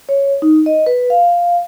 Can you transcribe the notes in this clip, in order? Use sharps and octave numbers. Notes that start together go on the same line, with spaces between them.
C#5
D#4
D#5
B4
F5